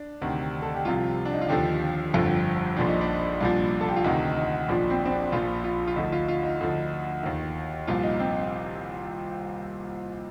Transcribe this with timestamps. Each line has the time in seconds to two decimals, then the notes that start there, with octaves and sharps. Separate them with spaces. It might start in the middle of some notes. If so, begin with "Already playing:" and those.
Already playing: D4
0.22 D2 C3 D#3
0.62 A4
0.75 G4
0.85 C2 C3 F3 F4
1.25 D4
1.33 D#4
1.41 F4
1.49 D#2 D3 F3 G4
2.14 G1 F2 D3 F3
2.76 A#1 A#2 F3 D4
2.88 D#4
3.01 D4
3.41 C2 A#2 F3
3.81 A4
3.89 G4
3.96 F4
4.04 D2 C3 D#3 D#4
4.37 D#4
4.68 A#1 A#2 F3 D4
4.90 C4
5.06 C4
5.11 D4
5.32 A#1 A#2 F3 F4
5.64 F4
5.87 F4
5.96 D2 D3 F3 D#4
6.12 F4
6.28 F4
6.43 D#4
6.60 D2 D3 F3
7.23 D#2 D#3
7.87 C2 A#2 F3 F4
8.03 D#4
8.19 C4